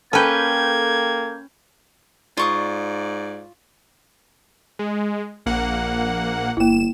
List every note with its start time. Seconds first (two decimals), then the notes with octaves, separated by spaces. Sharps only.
0.13 A#3 C#4 A4 B4 G5 G6 G#6
2.37 G#2 F4 D5 C#6 D#6
4.79 G#3
5.46 A#1 A#3 F#5
6.57 G1 A#3 E4 E7